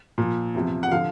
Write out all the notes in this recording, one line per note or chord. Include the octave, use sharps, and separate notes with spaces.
A#2 F3
E2 C3 F3
F#5
D3 F3 F5